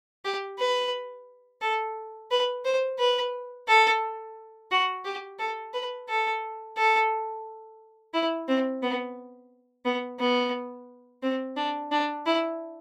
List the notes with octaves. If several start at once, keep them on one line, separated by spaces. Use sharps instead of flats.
G4
B4
A4
B4
C5
B4
A4
F#4
G4
A4
B4
A4
A4
E4
C4
B3
B3
B3
C4
D4
D4
E4